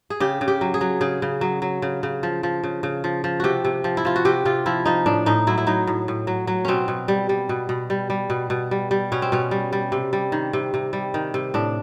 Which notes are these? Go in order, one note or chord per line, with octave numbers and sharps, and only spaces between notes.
G#4
C#3 G4
C#3
G4
F#3
G#4
F#3
C#3 G#4
C#3
F#3
F#3
C#3
C#3
F3
F3
C#3
C#3
F3
F3
C3 F#4 G4
C3
F3
E4
F3 F4
F#4
C3 G4
C3 F4
F3 E4
F3 D#4
A2 D4
A2 D#4
F#3 E4
E4
F#3 D#4
A2
A2
F#3
F#3
B2 C4 C#4
B2
G3
G3
B2
B2
G3
G3
B2
B2
G3
G3
B2 C#4
C4
B2 C#4
G3
G3
C3
G3
D#3
C3
C3
G3
D#3
C3
A2 D4